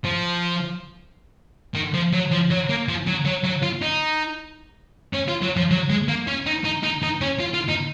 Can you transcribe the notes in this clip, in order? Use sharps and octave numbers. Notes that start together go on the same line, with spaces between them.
F3
D#3
F3
F#3
F3
F#3
A#3
F3
F#3
F#3
F#3
F4
D#4
C#4
F4
F#3
F3
F#3
G#3
A#3
C#4
D#4
D#4
D#4
D#4
C#4
F4
F4
D#4